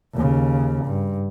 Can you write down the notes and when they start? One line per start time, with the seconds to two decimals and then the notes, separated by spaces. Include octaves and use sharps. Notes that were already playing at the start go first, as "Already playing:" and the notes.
0.14 D#2 C#3
0.86 G2